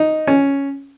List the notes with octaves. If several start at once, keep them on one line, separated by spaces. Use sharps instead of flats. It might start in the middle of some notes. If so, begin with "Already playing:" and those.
Already playing: D#4
C#4